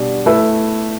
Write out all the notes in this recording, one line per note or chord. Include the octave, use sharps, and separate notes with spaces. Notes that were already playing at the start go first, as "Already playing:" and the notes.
Already playing: B2 G3 D4 F#4
A3 E4 B4 E5